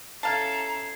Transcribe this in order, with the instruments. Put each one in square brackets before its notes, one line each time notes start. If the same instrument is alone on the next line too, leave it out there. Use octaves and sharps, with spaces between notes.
[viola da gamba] C#4 E4 A4 [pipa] F5 A5 [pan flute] A#5 [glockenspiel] G#6 C7